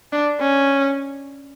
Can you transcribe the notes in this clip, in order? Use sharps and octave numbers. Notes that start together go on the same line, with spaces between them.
D4
C#4